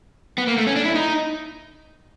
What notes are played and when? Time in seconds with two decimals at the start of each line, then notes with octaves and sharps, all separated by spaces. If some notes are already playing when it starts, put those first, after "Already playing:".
0.38 B3
0.47 A#3
0.58 A3
0.67 C#4
0.76 D4
0.85 E4
0.95 D#4